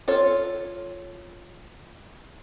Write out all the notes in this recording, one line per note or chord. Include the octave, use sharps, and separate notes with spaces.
F4 A4 C#5